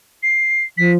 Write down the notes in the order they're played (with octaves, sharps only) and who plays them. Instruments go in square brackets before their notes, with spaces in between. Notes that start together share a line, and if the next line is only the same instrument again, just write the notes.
[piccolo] C7
[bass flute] F3 [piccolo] B6